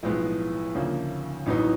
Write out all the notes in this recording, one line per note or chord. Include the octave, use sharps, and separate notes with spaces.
B1 A2 F3 G#3 B3
D2 C#3 F3 A#3
A1 A2 F#3 B3 D#4